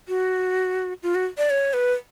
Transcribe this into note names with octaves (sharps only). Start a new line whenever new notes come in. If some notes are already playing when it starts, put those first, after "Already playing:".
F#4
F4
F#4
D5
C#5
B4